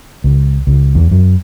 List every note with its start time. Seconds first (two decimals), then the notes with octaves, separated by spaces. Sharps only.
0.24 C#2
0.67 C#2
0.95 E2
1.11 F#2